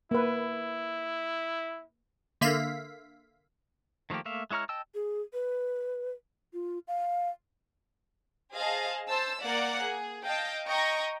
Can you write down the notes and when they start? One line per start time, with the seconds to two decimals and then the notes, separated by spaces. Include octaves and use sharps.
0.11 A#3 E4 B4
2.41 D3 A#3 E5 F5 B6
4.10 D#3 F3 A3 A#3 G4
4.25 A3 A#3 E5 F5
4.51 G#3 E4 C#5 A#5 F6
4.69 D#5 G5 A5 E6
4.95 G#4
5.33 B4
6.54 F4
6.88 F5
8.54 G#4 C5 D#5 F5 A5
9.09 C5 A5 E6
9.42 A#3 D5 F#5
9.84 G#4
10.24 D#5 F5 G5 A5
10.67 D#5 G5 A#5 C#6